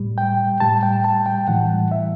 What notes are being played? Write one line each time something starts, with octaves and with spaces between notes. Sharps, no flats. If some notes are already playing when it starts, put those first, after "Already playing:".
Already playing: A2 G3
G5
A2 G3 A5
G5
A5
G5
A2 E3 G3 F#5
E5